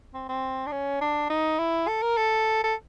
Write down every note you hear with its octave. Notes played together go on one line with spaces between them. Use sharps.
C4
C4
D4
C#4
D4
D#4
E4
A4
A#4
A4
A4